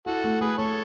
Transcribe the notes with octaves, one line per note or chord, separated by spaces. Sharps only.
E4 F#4 A4
A3
A3 G#4 B4
A3 A4 C#5